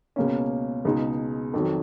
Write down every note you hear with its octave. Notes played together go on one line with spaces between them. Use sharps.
C#2 B2 A#3 C#4
C#2 B2 G#3 D#4
F2 D#3 F#3